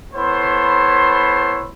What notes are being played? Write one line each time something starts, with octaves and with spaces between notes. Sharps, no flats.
B3 E4 A4 C5 C#5 C6